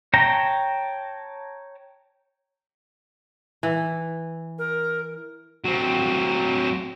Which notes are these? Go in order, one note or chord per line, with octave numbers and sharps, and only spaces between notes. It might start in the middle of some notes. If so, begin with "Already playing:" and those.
C#5 G5 A5 A#5
E3
A#4
F#3 C4